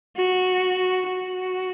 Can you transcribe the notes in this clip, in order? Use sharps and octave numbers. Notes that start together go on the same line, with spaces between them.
F#4
F#4